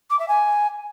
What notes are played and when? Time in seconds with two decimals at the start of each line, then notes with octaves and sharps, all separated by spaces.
0.10 D6
0.19 E5
0.28 G#5